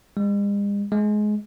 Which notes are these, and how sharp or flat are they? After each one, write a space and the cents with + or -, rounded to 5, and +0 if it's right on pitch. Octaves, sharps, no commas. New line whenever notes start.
G#3 -45
G#3 +20